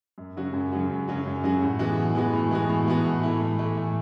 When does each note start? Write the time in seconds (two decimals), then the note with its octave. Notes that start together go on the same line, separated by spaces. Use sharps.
0.18 F#2
0.36 C#3 F#3 C#4 F#4
0.53 F#2
0.72 C#3 F#3 C#4 F#4
0.90 F#2
1.08 C#3 F#3 C#4 F#4
1.26 F#2
1.44 C#3 F#3 C#4 F#4
1.62 A2
1.79 E3 G#3 B3 F#4
1.97 A2
2.15 E3 G#3 B3 F#4
2.34 A2
2.51 E3 G#3 B3 F#4
2.69 A2
2.88 E3 G#3 B3 F#4
3.05 A2
3.23 E3 A3 E4
3.40 A2
3.59 E3 A3 E4
3.77 A2